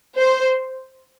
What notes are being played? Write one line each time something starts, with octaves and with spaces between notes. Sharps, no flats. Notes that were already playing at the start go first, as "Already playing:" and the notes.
C5